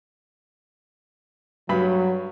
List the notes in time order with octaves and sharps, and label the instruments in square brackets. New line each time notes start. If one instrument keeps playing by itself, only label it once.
[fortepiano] G2 B5 [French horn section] F#3